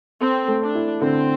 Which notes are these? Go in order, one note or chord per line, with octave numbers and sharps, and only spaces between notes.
C4 A4
A3
D4
E4
D3 C4